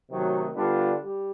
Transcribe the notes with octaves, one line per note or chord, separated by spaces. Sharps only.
C3 D#3 F#3 A3
D3 G3 B3 D4 F4
G3